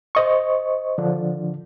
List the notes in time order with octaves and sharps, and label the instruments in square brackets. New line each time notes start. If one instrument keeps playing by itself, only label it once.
[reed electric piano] C5 D#5 C#6
D3 F3 D4